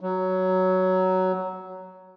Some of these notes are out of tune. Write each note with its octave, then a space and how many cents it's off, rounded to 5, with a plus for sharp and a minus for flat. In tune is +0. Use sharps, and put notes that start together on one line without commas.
F#3 +10